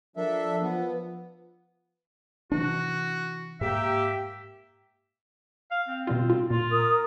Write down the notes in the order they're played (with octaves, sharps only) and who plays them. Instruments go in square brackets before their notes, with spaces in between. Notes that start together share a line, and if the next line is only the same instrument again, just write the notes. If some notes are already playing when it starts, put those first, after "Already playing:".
[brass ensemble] F3 A#4 [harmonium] D4 A4 E5
[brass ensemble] F3 [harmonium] B3
[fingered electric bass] C3 E3 D4 [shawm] F#4
[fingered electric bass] G#2 [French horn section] A#3 G4 [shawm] E5
[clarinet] F5
C4
[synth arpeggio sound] B2 G3 F4
F4
[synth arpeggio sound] A#2 [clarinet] F4
[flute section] A#4 D#6